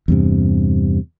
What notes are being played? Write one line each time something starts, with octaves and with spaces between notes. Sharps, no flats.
E2 G2 C3